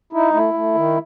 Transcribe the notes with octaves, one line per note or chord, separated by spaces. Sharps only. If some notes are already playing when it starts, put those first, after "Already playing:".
D#4 E4
A3 E4
A3
D#3